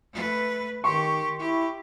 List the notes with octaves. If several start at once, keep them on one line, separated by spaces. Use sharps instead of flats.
A3 B4
D#3 G4 C6 C#6
E4 G4